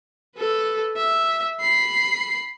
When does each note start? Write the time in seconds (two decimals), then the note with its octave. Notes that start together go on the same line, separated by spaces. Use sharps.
0.37 A4 B4
0.96 E5
1.61 B5 C7